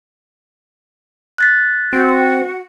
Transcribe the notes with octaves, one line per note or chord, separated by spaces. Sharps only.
F#6 A6 B6
C4 F#4